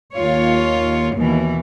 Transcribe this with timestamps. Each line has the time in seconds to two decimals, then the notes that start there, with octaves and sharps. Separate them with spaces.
0.14 D#2 F4 C#5
1.15 D#2 B2 E3